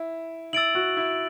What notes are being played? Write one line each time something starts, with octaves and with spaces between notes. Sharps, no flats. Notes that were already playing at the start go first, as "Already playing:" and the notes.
Already playing: E4
E4 E6 A6 D7 F#7
F#4
E4